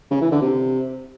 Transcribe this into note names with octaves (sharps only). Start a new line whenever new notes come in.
C#3
E3
D3
C3